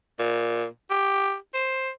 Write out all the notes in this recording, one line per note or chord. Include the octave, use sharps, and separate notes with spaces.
A#2
G4
C5